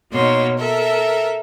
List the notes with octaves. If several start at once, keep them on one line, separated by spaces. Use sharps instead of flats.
B2 A#3 D#4 C#5 C6
A4 A#4 E5